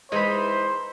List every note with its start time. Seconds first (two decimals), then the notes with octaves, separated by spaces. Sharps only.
0.12 E3 G#3 D#4 C5 B5